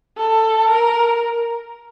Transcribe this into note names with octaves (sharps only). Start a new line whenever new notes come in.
A4
A#4